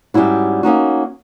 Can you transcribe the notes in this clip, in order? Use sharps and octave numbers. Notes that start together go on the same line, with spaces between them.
G#2 G3 C#4 E4 F#4
A#3 C#4 D#4 F#4